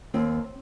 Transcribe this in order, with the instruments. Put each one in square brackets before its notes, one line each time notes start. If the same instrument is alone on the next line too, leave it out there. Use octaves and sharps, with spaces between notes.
[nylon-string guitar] D#2 C4